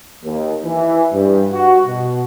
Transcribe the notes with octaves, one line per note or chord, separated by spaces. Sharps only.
D#2
E3
G2
F#4
B2